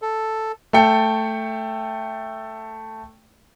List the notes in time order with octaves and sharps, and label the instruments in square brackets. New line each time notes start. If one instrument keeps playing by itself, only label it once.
[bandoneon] A4
[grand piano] A3 A4 G5 C#7